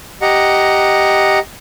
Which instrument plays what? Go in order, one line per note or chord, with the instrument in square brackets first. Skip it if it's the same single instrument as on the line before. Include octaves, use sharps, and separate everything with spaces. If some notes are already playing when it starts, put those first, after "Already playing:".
[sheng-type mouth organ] G4 D#5 F#5 A#5